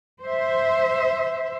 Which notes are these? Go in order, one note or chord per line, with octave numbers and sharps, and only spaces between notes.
C5 E5